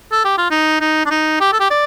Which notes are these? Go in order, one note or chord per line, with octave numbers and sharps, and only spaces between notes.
A4
G4
F4
D#4
D#4
D4
D#4
G4
A4
G4
D5